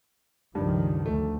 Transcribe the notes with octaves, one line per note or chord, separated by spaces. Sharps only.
C#2 G2 D#3 F3
D2 A3